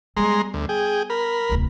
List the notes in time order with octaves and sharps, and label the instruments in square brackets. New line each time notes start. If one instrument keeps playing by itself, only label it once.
[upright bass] G3 B3 [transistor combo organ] G#3 A#5 C6
[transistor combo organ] D2
G#4 G5
A#4 B5
[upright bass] D1 C2